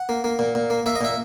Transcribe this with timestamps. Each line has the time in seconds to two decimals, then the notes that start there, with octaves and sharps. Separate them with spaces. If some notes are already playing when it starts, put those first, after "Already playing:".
Already playing: F#5
0.09 A#3
0.24 A#3
0.39 A#2
0.55 A#2
0.70 A#3
0.86 A#3 E5
0.96 D#5
1.01 A#2 E5